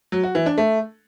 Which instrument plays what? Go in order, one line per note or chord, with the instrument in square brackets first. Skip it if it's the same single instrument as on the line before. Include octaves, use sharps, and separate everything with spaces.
[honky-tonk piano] F#3
F#4
E3
D4
A3